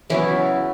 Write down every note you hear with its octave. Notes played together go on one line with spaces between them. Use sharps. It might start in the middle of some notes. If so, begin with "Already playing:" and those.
C#3 E3 F#3 B3 E4